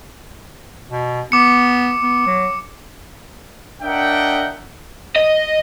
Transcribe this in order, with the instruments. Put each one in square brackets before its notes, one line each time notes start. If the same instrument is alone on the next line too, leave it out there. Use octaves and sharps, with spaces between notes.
[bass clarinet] B2
[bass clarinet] B3 [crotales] D6 C#7
[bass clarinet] B3
F#3
[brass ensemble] D4 A#4 D#5 E5 F#5 G5
[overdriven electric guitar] D#5